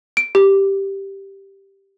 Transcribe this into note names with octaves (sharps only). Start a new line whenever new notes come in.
D7
G4